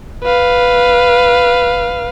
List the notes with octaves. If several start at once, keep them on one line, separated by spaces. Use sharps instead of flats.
B4 F5